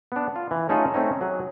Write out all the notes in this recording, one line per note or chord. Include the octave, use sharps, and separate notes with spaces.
B3 D4
F4
E3
A3 C#4 D#4 F4 G#4 A4
A3 C4 C#4 D#4
F#3 G#4